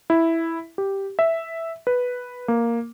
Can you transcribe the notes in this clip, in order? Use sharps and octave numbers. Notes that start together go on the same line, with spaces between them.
E4
G4
E5
B4
A#3